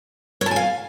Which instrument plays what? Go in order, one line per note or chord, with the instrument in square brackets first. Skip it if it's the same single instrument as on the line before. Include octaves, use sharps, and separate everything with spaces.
[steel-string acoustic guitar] C#5
A5
G#5
F5